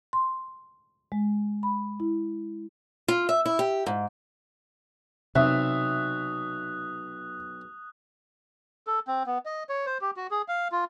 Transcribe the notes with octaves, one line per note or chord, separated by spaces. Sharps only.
C6
G#3
B5
E4
F4
E5
E4
G4
G#2
B1 C3 E5 D#6 F#6
A4
C4
B3
D#5
C#5
C5
G4
F#4
G#4
F5
F4